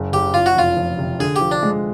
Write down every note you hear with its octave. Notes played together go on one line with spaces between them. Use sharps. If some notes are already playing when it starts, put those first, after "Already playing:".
Already playing: F#1
F#1 G4
F#1 F4
F#4
F1 F4
F3
C3
D3 G#4
G4
F3
D4
G#3